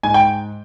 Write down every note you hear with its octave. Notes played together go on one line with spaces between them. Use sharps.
G#2 G#5
G5